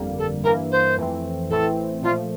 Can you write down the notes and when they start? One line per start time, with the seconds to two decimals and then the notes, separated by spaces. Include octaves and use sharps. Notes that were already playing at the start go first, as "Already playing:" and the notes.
Already playing: G1 F2 D3 G3 A#3
0.18 A4
0.44 G2 E3 A#3 E4 A#4
0.71 C5
0.98 F2 E3 A3 C4
1.49 A1 A2 E3 A3 C4 A4
2.02 A#2 F3 A3 F4